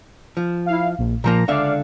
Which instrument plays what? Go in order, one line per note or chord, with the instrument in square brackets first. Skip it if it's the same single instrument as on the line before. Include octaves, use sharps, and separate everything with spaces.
[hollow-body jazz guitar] F3
[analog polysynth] E4 F5
A#1
[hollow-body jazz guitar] A#2 F3 A#3 [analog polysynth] A#5
[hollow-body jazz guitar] C#2 D3 E5 [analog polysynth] D5 F5